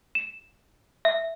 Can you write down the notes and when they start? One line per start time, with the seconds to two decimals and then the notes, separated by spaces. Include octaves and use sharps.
0.15 E7
1.05 E5